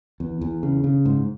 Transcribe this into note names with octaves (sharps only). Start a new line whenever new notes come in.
E2
E2
C#3
C#3
G#2